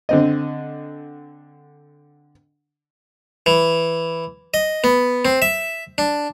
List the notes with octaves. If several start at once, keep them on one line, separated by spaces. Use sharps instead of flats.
D3 C4 D#5
E3
D#5
B3
C4
E5
D4